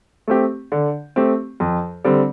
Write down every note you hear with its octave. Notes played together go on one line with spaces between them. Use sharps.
A3 C4 G4
D3
A3 C4 G4
F2
D3 G3 C4